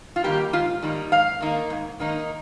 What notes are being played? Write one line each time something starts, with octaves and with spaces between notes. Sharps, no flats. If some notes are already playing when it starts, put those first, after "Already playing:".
F4
D#3 G3 A#3 D#4 G4
G#2 F4
D#3 G3 A#3 D#4
G#2 F5
D#3 A#3 D#4
G#2
D#3 A#3 D#4